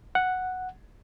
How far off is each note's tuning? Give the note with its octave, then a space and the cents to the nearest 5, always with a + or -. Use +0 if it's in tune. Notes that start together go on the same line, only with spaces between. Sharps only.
F#5 +0